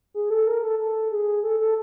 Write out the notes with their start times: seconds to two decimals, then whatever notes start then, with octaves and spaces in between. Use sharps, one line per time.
0.14 G#4
0.30 A4
0.47 A#4
0.63 A4
0.79 A4
1.12 G#4
1.43 A4
1.60 A4